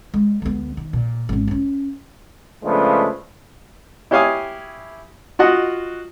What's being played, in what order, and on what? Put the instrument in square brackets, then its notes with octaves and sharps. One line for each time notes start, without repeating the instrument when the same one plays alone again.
[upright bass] G#3
D2 B3
D#3
A#2
G#1 C#4
C4 C#4
[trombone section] C#3 F3 G#3 A3 B3 D4
[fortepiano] E4 G4 C#5 F5 G#5 D#6
F4 F#4 D#5 F#5